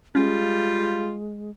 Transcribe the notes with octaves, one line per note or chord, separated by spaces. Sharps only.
G3 G#3 C#4 F4